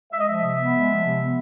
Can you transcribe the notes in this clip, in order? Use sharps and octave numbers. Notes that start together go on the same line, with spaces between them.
G#3 E5
D#5
F3 E5
C3
B3
G#3
F3
C3
B3